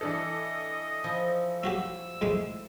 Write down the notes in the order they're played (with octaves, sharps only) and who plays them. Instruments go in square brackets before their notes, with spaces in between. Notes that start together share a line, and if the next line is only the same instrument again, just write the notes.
[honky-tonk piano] E3 D4 A4 [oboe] D#5
[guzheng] F3 E4
[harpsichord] C#4 F#4 G4 [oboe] E6
[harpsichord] C2 A2 G#3